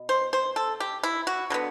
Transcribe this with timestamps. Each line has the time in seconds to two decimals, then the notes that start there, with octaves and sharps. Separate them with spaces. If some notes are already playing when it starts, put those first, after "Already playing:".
Already playing: B2
0.09 C5
0.33 C5
0.56 A4
0.80 G4
1.03 E4
1.27 F#4
1.50 D3 F#3 B3